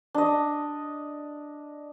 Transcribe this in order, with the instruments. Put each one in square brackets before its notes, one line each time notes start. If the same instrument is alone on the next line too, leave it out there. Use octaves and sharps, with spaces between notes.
[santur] D4 D#5